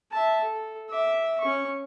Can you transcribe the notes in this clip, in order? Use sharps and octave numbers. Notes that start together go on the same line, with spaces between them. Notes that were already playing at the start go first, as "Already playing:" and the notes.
E5 A5
A4
E5 D6
C#4 C#6